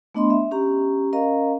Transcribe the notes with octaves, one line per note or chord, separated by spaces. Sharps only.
A3 B3 D4 D#5 B5 C6
E5
C#4 G4 A#5
C#4 A#4 D#5 F5 A#5